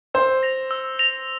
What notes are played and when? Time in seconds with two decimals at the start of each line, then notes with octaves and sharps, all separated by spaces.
0.14 C5 E6
0.43 A#6 F7
0.71 E6
0.99 A#6 F7